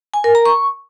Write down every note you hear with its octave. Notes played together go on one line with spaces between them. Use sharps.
G#5
A#4
A#5
C#6